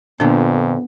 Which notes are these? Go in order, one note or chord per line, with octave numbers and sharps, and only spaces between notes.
F2 A#2 D3 B3 D4